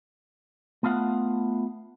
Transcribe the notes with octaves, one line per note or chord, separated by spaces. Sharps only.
A3 B3 F4 F5 F#5